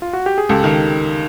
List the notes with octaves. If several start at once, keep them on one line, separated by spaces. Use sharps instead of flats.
F4
F#4
G4
G#4
C#2 G4 A4
D#3